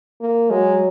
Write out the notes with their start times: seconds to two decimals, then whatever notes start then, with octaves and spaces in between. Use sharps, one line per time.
0.21 A#3
0.49 F#3 G#3